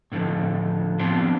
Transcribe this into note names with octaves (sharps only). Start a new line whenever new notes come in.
A2 D3 D#3 F3
F3 B3 C4 D4